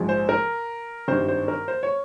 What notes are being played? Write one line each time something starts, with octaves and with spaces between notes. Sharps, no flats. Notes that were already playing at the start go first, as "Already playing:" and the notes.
Already playing: A#1 G#2 F3 G#3
C5
A#4
G#1 G2 D#3 G3 C5
C5
A#4
C5
C#5